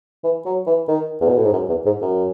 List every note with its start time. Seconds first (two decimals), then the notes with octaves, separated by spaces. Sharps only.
0.24 E3
0.45 F#3
0.67 E3
0.88 D#3
1.21 E2
1.29 B2
1.37 A2
1.45 G#2
1.53 F#2
1.69 E2
1.85 G#2
2.01 F#2